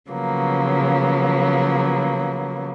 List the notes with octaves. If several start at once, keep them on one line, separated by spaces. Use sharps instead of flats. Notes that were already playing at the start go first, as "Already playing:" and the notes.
C#3 F3 F#3 A#3 B3